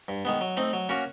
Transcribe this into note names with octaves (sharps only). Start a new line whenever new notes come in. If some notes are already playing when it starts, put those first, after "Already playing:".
G2
D#3 G#3 B3
F#3
A3 C4 D#4
F#3
A#3 C#4 F#4 A#4